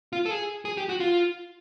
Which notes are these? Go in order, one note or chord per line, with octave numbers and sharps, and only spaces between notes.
F4
A4
G#4
G#4
G4
F#4
F4